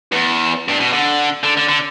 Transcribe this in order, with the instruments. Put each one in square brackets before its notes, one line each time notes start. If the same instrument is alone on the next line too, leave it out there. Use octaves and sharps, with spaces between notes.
[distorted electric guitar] E2
G2
B2
D3
D3
D3
D3